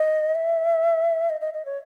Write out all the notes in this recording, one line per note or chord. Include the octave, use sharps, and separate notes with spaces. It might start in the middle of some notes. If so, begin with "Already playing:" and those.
Already playing: D#5
E5
D#5
D#5
D#5
C#5